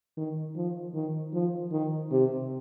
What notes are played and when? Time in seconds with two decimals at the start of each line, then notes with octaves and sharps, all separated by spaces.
0.17 D#3
0.56 F3
0.94 D#3
1.34 F3
1.72 D#3
2.12 C3